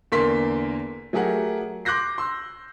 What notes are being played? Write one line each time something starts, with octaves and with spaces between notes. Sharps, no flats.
E2 D3 A#3 A#4 C6 B6
F#3 A3 G4 G#4 A#4 F#5
C6 D6 F#6 G6 A#6 C7
C6 E6